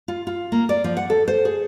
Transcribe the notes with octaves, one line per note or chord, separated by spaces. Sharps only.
F4
F4
A#3
D5
F3
F#5
A4
C5
G#4